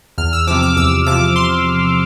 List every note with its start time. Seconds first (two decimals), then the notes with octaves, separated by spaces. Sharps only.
0.18 E2 F6
0.33 E6
0.47 C3 F3 D6
0.63 D6
0.77 E2 E6
1.07 C3 F3 D6
1.36 C6